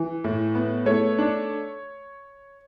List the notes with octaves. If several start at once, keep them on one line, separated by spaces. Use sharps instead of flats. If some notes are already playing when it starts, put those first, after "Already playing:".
Already playing: E3
A2
B3
A3 C#5
D4